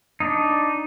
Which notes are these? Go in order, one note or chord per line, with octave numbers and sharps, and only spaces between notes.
D4 D#4